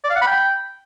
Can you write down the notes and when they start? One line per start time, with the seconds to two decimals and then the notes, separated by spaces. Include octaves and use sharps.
0.04 D5
0.10 F5
0.16 F#5
0.22 B5
0.27 G5